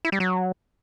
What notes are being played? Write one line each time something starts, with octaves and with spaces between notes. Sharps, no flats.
E4
G3
F#3